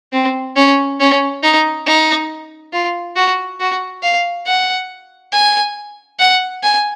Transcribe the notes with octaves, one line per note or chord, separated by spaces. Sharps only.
C4
C#4
C#4
D#4
D#4
F4
F#4
F#4
F5
F#5
G#5
F#5
G#5